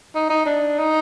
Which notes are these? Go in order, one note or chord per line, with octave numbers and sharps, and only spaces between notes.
D#4
D#4
D4
D#4